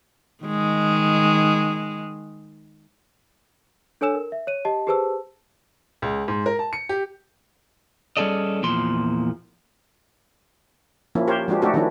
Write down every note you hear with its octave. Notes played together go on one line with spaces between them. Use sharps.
D#3 G#3
D4 A4 C#5 G#5 E6 E7
A#4
E5
C#5 D#7
G4 D#5 A5
G4 G#4 B4 C5 A5 E6
C#2
G#2
A#4
A5
C#7
G4
G3 C#4 G#4 A4 D5 D#5
E2 A#2 F3 C6
F3 A#3 C#4 E4
G4 A#4 C5 C#5
F3 G#3 D4 F#4 G4
A3 D4 D#4 F#4 G4 A4
D#3 F3 C#4 D4 E4